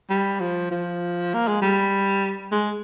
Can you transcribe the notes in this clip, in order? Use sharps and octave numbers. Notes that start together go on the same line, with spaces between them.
G3
F3
F3
A#3
G#3
G3
G#3